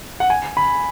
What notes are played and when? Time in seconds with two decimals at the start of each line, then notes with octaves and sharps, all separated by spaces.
0.20 F#5
0.30 G#5
0.57 B5